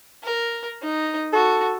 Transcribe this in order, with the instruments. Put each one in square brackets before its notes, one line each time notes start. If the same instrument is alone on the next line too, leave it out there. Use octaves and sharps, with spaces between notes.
[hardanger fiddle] A#4
D#4
[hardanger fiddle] F#4 [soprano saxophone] A4